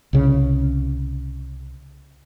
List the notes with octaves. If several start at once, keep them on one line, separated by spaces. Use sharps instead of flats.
C2 C#3